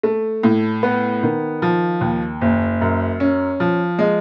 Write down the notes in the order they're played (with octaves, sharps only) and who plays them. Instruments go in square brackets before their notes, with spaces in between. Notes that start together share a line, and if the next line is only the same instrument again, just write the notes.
[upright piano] A3
A2
B3
D#3
F3
D#2
F#1
F#2
C#4
F3
G#3